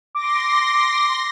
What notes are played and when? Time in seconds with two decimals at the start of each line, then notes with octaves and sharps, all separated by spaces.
0.15 C6 D6 A#6